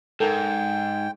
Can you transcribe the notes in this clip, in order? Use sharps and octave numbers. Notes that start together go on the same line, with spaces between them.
G#2 A4 A#4 G5